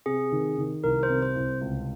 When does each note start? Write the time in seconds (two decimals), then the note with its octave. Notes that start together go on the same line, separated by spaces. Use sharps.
0.06 C3 G#4
0.32 D#3
0.58 D#3
0.83 C2 A#4
1.03 C5
1.09 C3
1.22 C5
1.36 C2
1.61 C#2